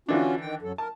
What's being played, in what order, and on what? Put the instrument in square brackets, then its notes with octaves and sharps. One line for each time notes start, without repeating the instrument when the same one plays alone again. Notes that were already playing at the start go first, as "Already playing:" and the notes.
[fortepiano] D3 E3 D4 [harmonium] C#4 F4 F#4
[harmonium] D#3 G5
F#2 F#3 A4
[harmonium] A#4 [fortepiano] A5